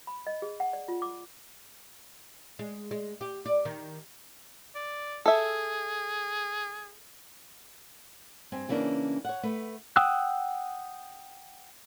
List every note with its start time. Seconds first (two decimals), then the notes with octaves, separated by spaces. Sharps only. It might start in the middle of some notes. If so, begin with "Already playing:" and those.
0.07 B5
0.27 D#5
0.42 G#4
0.60 F#5
0.73 D5
0.88 F4
1.02 D6
2.59 G#3
2.91 G#3
3.21 G4
3.46 D5
3.65 D#3
4.75 D5
5.26 G#4 A4 E5
8.52 G2 C4 G#5
8.69 C#3 E3 A#3 C#4 D4
9.25 C#5 F#5
9.43 A3 B4
9.96 F#5 G5 D#6 E6 F#6